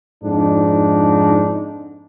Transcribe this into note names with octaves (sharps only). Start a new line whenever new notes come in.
F2 G#2 D4 D#4